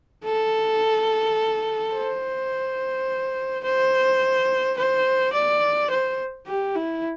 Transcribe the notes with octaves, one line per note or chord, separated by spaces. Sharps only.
A4
C5
C5
C5
D5
C5
G4
E4